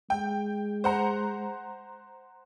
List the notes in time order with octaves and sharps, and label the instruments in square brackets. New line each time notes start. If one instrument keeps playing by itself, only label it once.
[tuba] G#3 [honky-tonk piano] G5
[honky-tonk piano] C5 F#5 A#5